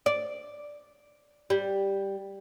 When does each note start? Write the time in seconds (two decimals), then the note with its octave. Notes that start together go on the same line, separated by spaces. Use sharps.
0.06 D5
1.50 G3